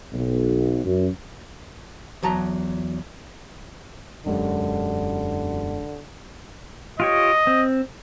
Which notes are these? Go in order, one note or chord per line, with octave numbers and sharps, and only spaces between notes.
B1
F#2
E2 F#3 A5 A#5
E1 F#2 D3 G#3 D4 G4
F4 G4 C#5 D#5
C4